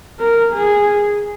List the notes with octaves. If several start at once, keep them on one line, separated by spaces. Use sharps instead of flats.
A#4
G#4